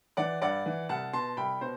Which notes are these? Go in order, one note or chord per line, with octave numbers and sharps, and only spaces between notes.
E3 D5 F#5
G2 D5 F#5
E3
C2 F#5 A5
B2 A5 C6
C2 G5 B5
B2 C5